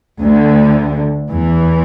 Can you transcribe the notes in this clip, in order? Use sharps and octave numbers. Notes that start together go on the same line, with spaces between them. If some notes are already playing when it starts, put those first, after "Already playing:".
D2 D3
E2 E3